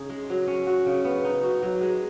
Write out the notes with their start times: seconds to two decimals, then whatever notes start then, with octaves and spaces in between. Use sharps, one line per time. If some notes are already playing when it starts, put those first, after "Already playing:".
Already playing: C#3 D#4 G#4
0.10 G#3
0.30 F#3
0.47 C#4
0.67 F#4
0.86 C#3
1.05 B3
1.25 D#4
1.43 F#4
1.62 F#3
1.81 G#3